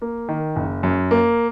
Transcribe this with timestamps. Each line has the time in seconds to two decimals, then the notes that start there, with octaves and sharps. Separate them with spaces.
0.02 A#3
0.29 D#3
0.56 F#1
0.83 F#2
1.11 A#3